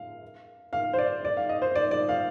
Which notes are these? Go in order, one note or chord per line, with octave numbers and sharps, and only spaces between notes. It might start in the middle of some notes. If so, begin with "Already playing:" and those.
Already playing: F5
F5
C5
D5
D5
F5
D#5
C5
D5
D5
F5